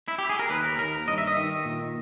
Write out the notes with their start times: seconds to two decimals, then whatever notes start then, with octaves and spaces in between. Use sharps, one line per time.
0.08 E4
0.18 G4
0.30 G#4
0.39 A#4
0.50 D#2 B4
0.64 A#4
0.79 D#2 A#4
1.08 G2 D#5
1.18 E5
1.27 D#5
1.37 D#3
1.65 A#2